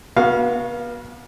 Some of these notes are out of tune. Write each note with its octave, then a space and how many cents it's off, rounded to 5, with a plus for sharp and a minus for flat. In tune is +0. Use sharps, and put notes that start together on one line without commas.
B3 -40 F#4 -15 F5 +0